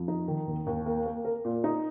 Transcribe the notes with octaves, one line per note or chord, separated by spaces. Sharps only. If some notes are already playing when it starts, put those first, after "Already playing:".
Already playing: F2
D#4
D#3
D#2
D#2
A#3
A#3
A#4
A#2
D#4